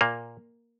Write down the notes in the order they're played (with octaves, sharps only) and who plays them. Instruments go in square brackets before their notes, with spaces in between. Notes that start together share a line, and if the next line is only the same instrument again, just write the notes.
[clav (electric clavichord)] A#2 A#3